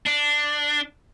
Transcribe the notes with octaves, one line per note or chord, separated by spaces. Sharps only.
D4